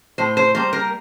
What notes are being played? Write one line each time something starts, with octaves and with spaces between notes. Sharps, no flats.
A2 C5
C5
G3 A#3 C5
A#4